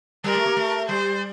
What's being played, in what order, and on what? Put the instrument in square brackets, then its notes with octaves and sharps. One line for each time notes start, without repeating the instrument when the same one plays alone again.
[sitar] G3 [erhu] A#4
[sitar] A3
A#3
A3
[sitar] G3 [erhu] C5